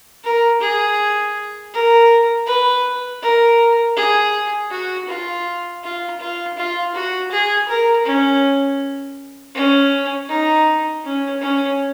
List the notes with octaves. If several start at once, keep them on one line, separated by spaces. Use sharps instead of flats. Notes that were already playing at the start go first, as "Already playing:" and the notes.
A#4
G#4
A#4
B4
A#4
G#4
F#4
F4
F4
F4
F4
F#4
G#4
A#4
C#4
C#4
D#4
C#4
C#4